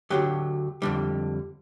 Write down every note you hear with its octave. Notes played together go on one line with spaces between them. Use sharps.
D2 D3 F#3 G4
F2 D3 G3